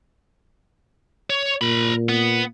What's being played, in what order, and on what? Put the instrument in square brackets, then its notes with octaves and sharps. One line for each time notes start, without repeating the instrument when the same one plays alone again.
[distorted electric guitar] C#5
[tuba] A#2 [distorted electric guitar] A#4 B5
[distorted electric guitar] B3